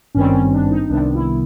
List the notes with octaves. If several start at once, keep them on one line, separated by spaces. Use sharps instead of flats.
G#1 G2 D#3 G3 C4 C#4
C#4
D4
D#4
C2 C3 D#3 G3 B3 D4
E4